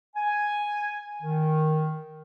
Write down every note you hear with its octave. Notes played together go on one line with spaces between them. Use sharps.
G#5
D#3